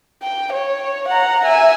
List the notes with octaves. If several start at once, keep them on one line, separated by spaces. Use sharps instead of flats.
G5
C#5
F#5 A#5
E5 G#5